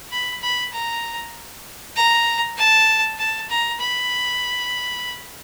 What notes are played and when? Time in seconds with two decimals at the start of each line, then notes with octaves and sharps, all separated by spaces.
0.11 B5
0.42 B5
0.73 A#5
1.96 A#5
2.57 A5
3.18 A5
3.49 A#5
3.80 B5